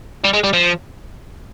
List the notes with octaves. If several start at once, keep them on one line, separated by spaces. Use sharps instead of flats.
G3
G#3
G3
F3